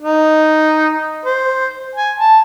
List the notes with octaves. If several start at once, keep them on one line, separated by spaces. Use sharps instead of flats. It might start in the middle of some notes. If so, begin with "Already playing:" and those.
D#4
C5
G#5
A5